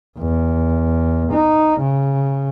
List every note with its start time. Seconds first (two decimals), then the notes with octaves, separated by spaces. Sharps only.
0.19 E2
1.32 D#4
1.80 C#3